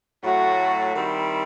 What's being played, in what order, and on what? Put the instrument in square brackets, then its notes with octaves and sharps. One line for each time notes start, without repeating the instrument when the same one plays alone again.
[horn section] A2 F#3 A3 [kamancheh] F#4
[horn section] D#3 G3 C4 E4